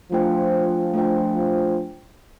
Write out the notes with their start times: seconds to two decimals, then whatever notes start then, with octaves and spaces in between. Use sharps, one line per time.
0.12 F3 A3 D4 F4 C5 G5
0.94 A3 D4 F4 C5 G5